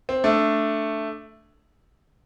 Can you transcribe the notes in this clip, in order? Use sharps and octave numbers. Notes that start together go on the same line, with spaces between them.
C4
A3 D4